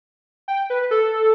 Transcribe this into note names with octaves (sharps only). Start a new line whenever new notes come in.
G5
B4
A4